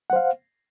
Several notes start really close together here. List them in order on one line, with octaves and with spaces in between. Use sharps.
F#5 C5 F5